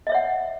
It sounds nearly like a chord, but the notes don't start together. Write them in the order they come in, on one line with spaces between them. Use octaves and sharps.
D#5 E5 C#5 F#5